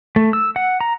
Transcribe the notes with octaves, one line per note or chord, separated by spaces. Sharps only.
A3
E6
F#5
A#5